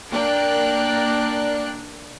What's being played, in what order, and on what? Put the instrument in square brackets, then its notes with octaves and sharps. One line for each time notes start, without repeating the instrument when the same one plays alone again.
[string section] A#3 D4 A#4 D5 G5 F#6